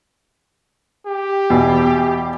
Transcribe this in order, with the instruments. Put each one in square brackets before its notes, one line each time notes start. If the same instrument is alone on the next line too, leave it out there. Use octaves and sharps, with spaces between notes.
[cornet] G4
[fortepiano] E2 B2